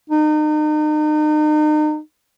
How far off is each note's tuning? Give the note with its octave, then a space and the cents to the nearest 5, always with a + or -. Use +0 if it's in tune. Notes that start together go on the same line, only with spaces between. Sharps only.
D#4 -35